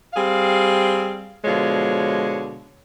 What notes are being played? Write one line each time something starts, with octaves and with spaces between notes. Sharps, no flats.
G3 C4 G#4 F5
B2 D3 F3 G#3 C#5